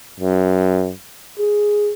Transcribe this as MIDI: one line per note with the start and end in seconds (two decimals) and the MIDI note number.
0.20 0.92 42
1.39 1.93 68